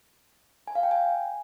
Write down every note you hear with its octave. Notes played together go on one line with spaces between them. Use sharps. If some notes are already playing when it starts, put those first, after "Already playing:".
G#5
F5
G5
G#5